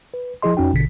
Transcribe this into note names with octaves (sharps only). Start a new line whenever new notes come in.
B4
F3 E4 G#4 D#5 C6
F2 C#4 D#4 F#4 G5
A1 B2 D3 B6